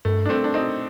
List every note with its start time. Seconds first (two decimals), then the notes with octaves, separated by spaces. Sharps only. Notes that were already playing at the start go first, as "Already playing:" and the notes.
0.05 G2 A3
0.25 D4
0.29 A3 C4
0.44 D4
0.54 C4 D#4